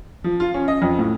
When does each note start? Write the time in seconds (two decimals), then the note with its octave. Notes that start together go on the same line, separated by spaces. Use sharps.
0.24 F3
0.40 F4
0.54 C#4
0.68 D#5
0.82 F2
0.99 A2